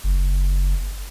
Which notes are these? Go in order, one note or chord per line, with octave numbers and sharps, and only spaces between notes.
F#1